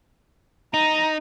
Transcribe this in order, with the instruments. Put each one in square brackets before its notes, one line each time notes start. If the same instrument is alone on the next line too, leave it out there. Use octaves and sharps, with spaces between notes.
[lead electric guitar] D#4 [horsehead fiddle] A#5